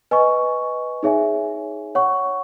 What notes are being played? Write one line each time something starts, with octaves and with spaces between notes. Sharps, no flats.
B4 D#5 G#5 C#6
D#4 G#4 C#5 E5 G#5
C#5 F#5 C#6